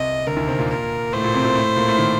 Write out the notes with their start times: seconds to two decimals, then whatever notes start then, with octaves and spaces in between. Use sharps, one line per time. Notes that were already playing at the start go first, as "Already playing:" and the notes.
Already playing: C2 C3 D#5
0.27 D2 D3 A#4
0.37 D#2 D#3
0.47 C3 C4
0.59 A#2 A#3
0.70 A#4
1.12 A2 A3 C5
1.23 A#2 A#3
1.34 C3 C4
1.44 A#2 A#3
1.55 A2 A3
1.77 A#2 A#3
1.88 A2 A3
1.98 D#3